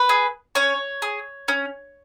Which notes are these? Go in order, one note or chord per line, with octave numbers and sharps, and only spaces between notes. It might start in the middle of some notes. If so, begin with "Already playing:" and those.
Already playing: B4
G#4
C#4 C#5
G#4
C#4